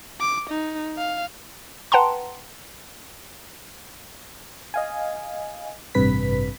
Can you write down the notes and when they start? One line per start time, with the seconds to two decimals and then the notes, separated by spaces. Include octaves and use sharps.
0.20 D6
0.50 D#4
0.98 F5
1.92 B4 F#5 G5 A5 A#5 C6
4.74 D#5 F5 G#5
5.95 A1 G2 C3 B4 B6